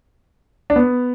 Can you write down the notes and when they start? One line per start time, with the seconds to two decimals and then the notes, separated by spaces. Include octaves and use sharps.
0.70 D4
0.76 B3